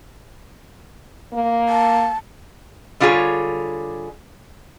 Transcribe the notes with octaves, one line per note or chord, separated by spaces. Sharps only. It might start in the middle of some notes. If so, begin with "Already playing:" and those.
A#3
A5
D3 G3 F4 G4 G#4 C#5